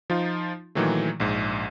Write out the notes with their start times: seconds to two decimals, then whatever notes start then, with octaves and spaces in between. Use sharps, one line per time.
0.10 F3 D#4 F4
0.75 A#2 D#3 E3 F#3 A3
1.20 A#1 G#2